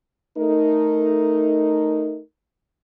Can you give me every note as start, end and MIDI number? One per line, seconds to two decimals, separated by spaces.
0.37 2.19 57
0.37 2.19 63
0.37 2.19 70